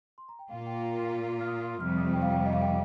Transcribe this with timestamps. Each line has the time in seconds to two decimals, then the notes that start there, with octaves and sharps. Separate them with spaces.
0.18 C6
0.29 A#5
0.39 G5
0.50 A#2 A#3 F4 F5
0.66 G5
0.82 A#5
0.99 C6
1.41 F6
1.47 D#6
1.64 C6
1.80 F2 C3 G3 F6
1.97 D#6
2.13 G5
2.22 F5
2.32 G5
2.46 D#5
2.53 F5
2.62 G5